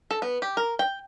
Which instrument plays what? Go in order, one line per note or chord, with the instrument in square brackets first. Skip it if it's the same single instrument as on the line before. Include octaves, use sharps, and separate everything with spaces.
[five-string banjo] A4
B3
G4
A#4
G5